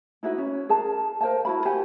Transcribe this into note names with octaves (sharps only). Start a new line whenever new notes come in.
D#4 E4 F#4 B4
C#4
G#4 A#4 A5
A#4 C5 F5 A5
E4 F#4 B5
G4 A#4 F#5 G#5